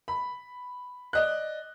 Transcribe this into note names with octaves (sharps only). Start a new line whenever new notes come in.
B5
D5 D#5 F#6